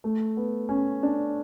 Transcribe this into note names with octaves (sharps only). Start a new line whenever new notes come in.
A3
B3
C#4
D4